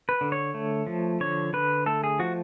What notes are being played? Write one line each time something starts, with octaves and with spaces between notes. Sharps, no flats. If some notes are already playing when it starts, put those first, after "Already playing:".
B4
D3
C#5
A3
F3
D3 C#5
D3 B4
A3 A4
G#4
F3 F#4